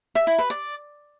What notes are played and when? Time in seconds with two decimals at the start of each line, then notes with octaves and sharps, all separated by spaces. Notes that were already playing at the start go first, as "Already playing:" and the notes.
0.15 E5
0.27 E4
0.38 B4
0.50 D5